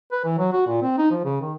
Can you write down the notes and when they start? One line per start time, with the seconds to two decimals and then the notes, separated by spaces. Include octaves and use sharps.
0.12 B4
0.25 E3
0.38 F#3
0.52 F#4
0.67 A#2
0.82 C4
0.98 D#4
1.11 F3
1.25 C#3
1.41 D#3